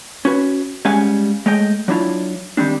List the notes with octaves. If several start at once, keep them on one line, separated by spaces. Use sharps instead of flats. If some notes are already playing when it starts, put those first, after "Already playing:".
C#4 F#4 B4
G3 G#3 C#4 F5 F#5 G#5
G#3 A3 C#5 D#5 G5
F#3 D4 E4 F4
D#3 G3 G#3 C4 D4